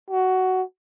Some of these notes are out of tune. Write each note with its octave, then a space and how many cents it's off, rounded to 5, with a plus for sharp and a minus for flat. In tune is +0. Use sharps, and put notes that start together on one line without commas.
F#4 +10